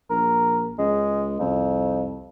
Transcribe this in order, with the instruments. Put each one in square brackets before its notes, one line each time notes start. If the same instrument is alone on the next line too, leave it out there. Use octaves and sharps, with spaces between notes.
[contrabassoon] A#1 [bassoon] A#4
[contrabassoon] C#2 [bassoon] G#3
[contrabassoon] C2 [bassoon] F2